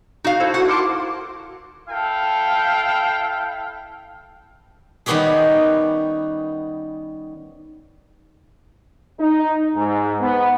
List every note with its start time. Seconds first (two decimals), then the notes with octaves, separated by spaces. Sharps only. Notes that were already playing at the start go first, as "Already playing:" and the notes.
0.24 D#4 F#4 F5
0.40 E4 A4 C5
0.54 F#4 F#5
0.68 A#4 A5 C6 D6
1.88 E4 A4 F5 G5
5.06 D#3 G3 B3 C#4 G4 G#4
9.20 D#4
9.75 G#2
10.21 B3